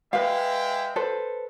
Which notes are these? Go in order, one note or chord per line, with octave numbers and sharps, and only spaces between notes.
G#3 B4 E5 F5 G5
A4 B4 C5